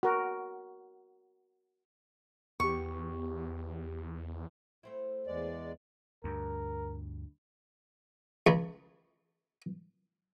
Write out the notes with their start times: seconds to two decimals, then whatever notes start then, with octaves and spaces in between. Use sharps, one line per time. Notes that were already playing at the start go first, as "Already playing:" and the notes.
0.03 F#4 A#4
2.60 E2 B3 G4 C#6
4.83 A3 C4 E4
5.27 E2 G#3 D5
6.24 D2 G2 A#4
8.47 C#2 C#3